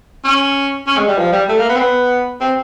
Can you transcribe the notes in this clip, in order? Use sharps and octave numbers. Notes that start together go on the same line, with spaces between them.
C#4
C#4
G#3
G3
F3
G3
A3
A#3
B3
C4
B3
C4